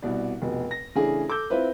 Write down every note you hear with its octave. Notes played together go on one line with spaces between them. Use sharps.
C2 B2 D5
F1 B2
A#6
C#3 E3 A3 D4 G#4
A4 D6 E6 G6
C4 E4 F4 B4 C5